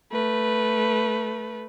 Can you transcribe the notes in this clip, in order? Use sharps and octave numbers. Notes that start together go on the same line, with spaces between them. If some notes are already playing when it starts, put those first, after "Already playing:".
A3 B4